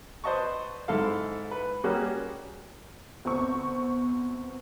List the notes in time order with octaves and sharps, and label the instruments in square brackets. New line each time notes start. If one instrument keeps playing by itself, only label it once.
[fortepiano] B4 C5 D5 D#5 A5 C#6
G#2 E4 A4 F5
B4
G3 A#3 C#4 F#4 G#4 F#6
[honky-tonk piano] D2 C4 C#6 [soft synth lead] B3